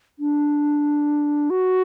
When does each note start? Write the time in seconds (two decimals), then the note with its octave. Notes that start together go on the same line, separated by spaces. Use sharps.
0.19 D4
1.50 F#4